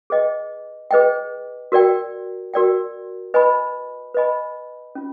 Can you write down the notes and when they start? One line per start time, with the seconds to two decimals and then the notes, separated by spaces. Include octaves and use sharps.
0.10 G#4 B4 D#5 G5
0.91 G#4 B4 D#5 G5
1.72 F#4 A#4 D5 G5
2.54 F#4 A#4 D5 G5
3.34 B4 D#5 G#5 B5
4.14 B4 D#5 G#5 B5
4.95 C#4 F4